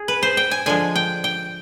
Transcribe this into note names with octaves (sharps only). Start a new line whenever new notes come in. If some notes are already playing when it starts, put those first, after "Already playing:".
Already playing: G#4
B4
C5
G5
G#5
D3 F3 G#3 G#5
G5
G5